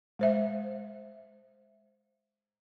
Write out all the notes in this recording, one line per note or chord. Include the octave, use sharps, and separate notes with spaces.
G#3 C5 E5